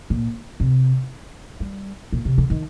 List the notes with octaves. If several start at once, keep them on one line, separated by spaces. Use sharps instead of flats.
A#2
C3
G3
A#2
C3
D3
D#3